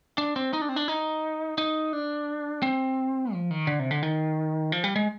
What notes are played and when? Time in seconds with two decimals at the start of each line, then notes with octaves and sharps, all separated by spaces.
0.18 D4
0.36 C4
0.53 D#4
0.61 D4
0.69 C4
0.76 D4
0.88 D#4
1.58 D#4
1.93 D4
2.63 C4
3.33 F3
3.51 D#3
3.67 D3
3.79 C3
3.91 D3
4.03 D#3
4.72 F3
4.84 G3
4.96 G#3